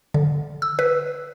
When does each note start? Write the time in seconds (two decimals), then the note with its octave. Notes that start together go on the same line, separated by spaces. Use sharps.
0.14 D3
0.62 E6
0.79 B4